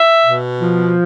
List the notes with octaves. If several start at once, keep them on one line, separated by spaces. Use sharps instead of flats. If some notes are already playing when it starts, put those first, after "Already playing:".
Already playing: E5
B2
F3